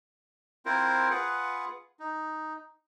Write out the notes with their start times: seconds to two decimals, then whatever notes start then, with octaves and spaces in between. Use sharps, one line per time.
0.66 C4 E4 F4 A#4 C5
1.10 F4 G#4 B4 F#5
2.00 D#4